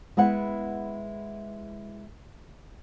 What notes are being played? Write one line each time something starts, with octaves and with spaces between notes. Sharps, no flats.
G#3 B3 E4 F#5